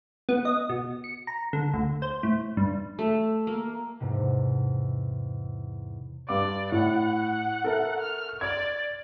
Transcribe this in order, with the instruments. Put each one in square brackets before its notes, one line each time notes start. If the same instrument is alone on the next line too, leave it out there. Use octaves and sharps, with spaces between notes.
[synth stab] B3
D#5
B2
C#7
A#5
D3
D2
C5
A2
G2
[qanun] A3
A#3
[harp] E2 G#2 C3
[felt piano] G2 D6 [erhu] D5
[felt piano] A2 [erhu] F#5
[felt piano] A4 A#4 E5
[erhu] F6
[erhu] D5 [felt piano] G#6